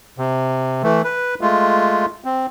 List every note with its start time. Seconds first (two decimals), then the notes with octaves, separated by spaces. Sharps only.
0.18 C3
0.83 E3 A3
1.04 B4
1.41 G#3 A3 F4
2.25 C4